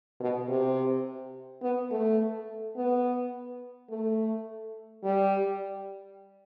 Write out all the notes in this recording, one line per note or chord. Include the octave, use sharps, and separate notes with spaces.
B2
C3
B3
A3
B3
A3
G3